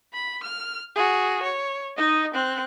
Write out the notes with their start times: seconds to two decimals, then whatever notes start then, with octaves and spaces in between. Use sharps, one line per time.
0.13 B5
0.43 F6
0.95 F#4 G#4
1.42 C#5
1.97 D#4 D#5
2.34 C4 F#6